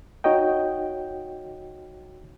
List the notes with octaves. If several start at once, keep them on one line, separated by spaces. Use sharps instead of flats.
D#4 F#4 C#5 D#5 G5